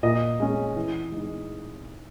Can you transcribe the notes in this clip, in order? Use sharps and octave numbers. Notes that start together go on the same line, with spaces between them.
A#2 D#5
G#3 C#4
E3
G#3 D#4